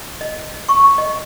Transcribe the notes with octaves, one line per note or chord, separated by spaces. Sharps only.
D#5
C#6
D#5